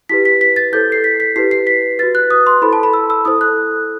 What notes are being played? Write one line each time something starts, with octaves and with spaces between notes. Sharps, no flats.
E4 G4 B4 B6
B6
B6
A6
E4 A4 C5 G6
C7
B6
B6
E4 G4 B4 C7
C7
B6
F#4 B4 A6
F#6
D#6
C6
E4 A4 C5 B5
A5
B5
E6
E6
E4 A4 C5 D#6
F#6